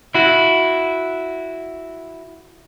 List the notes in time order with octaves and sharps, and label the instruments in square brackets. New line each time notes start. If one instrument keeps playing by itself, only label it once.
[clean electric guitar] E4 F#4